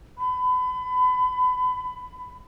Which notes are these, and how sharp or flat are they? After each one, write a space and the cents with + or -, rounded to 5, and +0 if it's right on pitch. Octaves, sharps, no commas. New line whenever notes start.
B5 +30